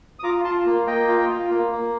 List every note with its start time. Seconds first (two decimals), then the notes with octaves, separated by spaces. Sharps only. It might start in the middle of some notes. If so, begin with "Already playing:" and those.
0.19 D#6
0.24 F4 A#5 D6
0.44 F4 A5 C6
0.66 A#3
0.87 A#3 D#5 G5
1.08 F4
1.29 F4
1.51 A#3
1.72 A#3